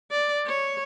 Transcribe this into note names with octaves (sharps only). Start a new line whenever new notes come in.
D5
C#5